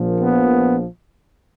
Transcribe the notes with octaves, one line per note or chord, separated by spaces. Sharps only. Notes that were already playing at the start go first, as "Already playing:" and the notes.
Already playing: A#1 A#2 F3
B3